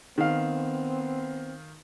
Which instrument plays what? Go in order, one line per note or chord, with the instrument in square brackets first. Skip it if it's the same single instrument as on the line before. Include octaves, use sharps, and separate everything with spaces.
[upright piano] D#3 F5 [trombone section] B3 C4